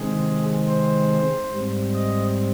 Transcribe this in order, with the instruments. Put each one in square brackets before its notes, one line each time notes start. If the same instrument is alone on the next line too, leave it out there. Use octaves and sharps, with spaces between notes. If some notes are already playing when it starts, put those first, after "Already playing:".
Already playing: [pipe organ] C3 D#3 G#3 C4 G#4
C5
G#2 G3 C4
D#5